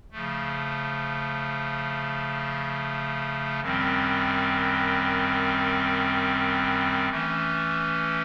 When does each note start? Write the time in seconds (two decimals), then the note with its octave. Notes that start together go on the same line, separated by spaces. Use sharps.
0.12 C#3 F3 A3
3.61 F#2 D#3 G3 C4
7.10 E3 A3 C#4